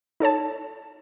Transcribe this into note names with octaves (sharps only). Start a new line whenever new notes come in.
D#4 A4 C#5 A5